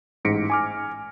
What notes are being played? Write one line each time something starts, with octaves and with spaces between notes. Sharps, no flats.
A1 G#2 A#6 B6 C#7 D7
G#5 D6 F6